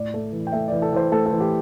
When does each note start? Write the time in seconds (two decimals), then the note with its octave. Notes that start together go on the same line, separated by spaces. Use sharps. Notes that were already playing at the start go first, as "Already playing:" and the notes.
Already playing: A2 D5
0.14 A3
0.32 E3
0.47 G5
0.52 A3 E5
0.68 E3 D5
0.82 A4
0.92 E3 C5
1.12 A3 A4
1.26 A4
1.31 E3
1.40 G4